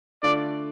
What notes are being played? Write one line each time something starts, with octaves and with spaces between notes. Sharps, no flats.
D3 A3 D4 F4 D5